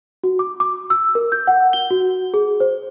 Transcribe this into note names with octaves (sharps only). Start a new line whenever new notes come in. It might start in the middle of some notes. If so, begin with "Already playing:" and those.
F#4
D6
D6
E6
A#4
G6
F#5
G7
F#4
G#4
C5